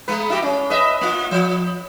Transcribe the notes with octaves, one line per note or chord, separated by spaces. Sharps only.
G#3 B3 B4
E4 F#4 G4
C#4
B4 D#5 E5
A#3 F4
F3